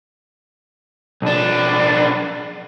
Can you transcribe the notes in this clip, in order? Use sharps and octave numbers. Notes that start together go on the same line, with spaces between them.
B1 D4